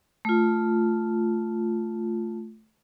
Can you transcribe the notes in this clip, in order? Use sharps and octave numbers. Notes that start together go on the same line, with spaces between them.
A3 F4